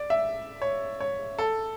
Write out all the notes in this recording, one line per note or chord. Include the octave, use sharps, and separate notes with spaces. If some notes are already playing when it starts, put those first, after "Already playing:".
Already playing: D5
E5
C#5
C#5
A4